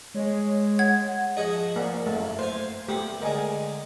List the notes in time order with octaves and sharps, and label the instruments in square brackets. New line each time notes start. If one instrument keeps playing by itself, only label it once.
[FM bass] G#3 [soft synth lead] C#5
[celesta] F#5 [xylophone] G#6
[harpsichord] F3 F#4 G#4 [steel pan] D#5
[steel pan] A#3 D5 F#5
[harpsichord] F#2 [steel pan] A3
[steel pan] C5 [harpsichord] F5 G#5
[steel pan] A3 G4 [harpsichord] B3
[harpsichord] D3 G#3 [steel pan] A#4 D#5 G#5